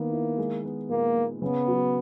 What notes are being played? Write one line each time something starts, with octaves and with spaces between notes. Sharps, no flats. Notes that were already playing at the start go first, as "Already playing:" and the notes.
Already playing: D#3 A#3 B3
E4
G#3
B3
A#2 A#3
A#2
C#3 B3
F#3